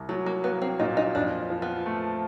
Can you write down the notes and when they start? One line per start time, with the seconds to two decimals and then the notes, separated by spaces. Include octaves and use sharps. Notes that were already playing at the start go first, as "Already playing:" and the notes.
Already playing: C2
0.09 F#3 A3
0.26 A#3
0.44 A#3 B3
0.62 C4
0.80 A#2 D#4
0.97 D#4
1.15 F2 D4
1.50 F3
1.62 B3
1.86 A3